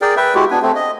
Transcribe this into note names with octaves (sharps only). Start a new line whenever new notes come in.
G#4 A#4 D5 G5
B4 E5 G5
G#3 E4 F#4 G4
B3 D4 G#5
A3 C4
D#5